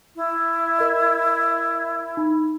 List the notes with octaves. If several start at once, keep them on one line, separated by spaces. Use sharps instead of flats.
E4
A#4 D#5
D#4 B5